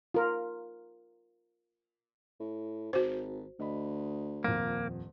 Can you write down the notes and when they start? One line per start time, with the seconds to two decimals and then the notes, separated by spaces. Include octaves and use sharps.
0.14 F4 A#4
2.40 A2
2.93 G#1 F#4 C5
3.60 D2 D#5 B5
4.44 D#1 F2 A#3